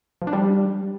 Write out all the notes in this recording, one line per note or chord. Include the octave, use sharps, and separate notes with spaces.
F3
D4
G3